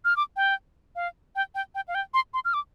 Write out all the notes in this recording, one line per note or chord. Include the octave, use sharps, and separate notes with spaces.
F6
D6
G5
F5
G5
G5
G5
F5
G5
C6
C6
F6
D6